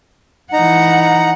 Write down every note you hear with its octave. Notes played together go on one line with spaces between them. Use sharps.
E3 D#4 F#5 A#5